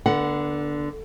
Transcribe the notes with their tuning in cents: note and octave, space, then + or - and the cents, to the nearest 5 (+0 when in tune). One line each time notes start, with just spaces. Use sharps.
D3 +0 B3 -30 F#5 +5